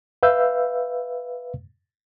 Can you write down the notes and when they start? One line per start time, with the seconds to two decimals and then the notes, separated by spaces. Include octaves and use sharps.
0.23 B4 E5 F5 E6 G6